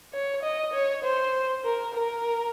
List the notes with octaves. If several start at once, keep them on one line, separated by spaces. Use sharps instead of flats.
C#5
D#5
C#5
C5
A#4
A#4